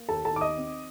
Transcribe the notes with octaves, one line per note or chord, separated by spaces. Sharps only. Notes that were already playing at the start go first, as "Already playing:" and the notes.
Already playing: A#3
D#2 A4 A5
A4 A5
D#3 D6
D#5 D#6
C4